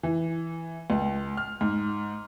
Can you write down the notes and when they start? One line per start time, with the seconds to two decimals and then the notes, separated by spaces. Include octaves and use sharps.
0.03 E3
0.90 C#2
1.37 F6
1.61 G#2